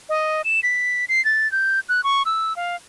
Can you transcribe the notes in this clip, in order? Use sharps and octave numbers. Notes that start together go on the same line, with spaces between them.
D#5
E7
B6
C7
A6
G6
F#6
C#6
E6
F5